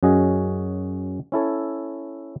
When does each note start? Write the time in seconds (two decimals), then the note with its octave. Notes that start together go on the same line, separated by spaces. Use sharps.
0.03 F#2 C#4 F#4 G#4 D#5
1.32 C#4 E4 A4 C#5